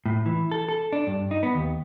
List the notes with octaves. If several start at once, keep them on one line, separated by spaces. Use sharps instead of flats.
A2
E3
A4
A4
D4
G2
D#4
B3
D#2